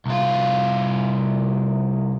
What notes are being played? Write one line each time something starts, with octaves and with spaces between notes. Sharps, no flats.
C2 F4